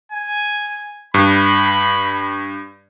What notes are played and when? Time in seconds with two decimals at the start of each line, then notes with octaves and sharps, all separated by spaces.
0.12 G#5
1.14 G2 B5